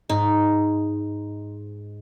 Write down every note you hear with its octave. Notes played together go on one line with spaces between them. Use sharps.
G#2 D#4